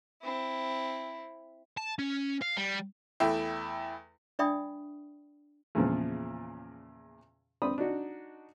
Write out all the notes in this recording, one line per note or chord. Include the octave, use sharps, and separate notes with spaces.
C4 E4
A5
C#4
F5
G3
E2 A3 E4 G5
D4 D5 E5 G5 B5 D#6
E2 A#2 C#3 F3
C4 D5 B5 D#6
D4 D#4 F#4